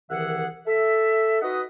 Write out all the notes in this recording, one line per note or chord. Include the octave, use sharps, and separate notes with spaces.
C2 D#3 E3 G#4 E5 F#5
A4 E5
D#4 F#4 B4 D#5 F#5 D#6